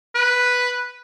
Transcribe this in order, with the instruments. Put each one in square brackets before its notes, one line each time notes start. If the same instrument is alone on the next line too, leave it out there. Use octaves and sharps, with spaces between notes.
[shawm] B4